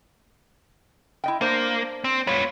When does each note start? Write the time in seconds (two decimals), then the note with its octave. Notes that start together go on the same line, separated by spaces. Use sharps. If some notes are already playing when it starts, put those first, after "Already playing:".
1.24 E4 D#5 G5
1.41 A#3 D4 C5
2.04 C4
2.27 B3 F4 C#5